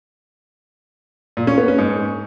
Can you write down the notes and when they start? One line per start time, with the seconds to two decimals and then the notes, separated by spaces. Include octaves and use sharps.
1.37 A#2
1.47 C#4
1.58 B3
1.68 C#4
1.78 G#2